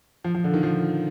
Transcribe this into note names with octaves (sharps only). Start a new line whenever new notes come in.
F3
F3
D3
D#3
F3